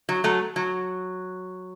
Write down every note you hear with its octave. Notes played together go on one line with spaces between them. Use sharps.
F#3
F#3 A3
F#3